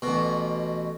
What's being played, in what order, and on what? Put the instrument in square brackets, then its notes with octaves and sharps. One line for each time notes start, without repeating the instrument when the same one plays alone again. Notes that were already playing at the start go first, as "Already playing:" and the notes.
[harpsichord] A1 B2